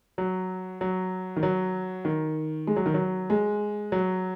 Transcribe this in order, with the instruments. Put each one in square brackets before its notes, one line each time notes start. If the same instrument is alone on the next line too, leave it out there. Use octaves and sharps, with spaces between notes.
[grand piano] F#3
F#3
D#3
F#3
D#3
G#3
F#3
D#3
F#3
G#3
F#3